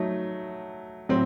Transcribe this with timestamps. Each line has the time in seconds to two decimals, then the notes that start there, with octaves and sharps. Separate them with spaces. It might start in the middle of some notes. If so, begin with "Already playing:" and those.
Already playing: F#3 A3 D#4 F#4
1.09 A2 F#3 C4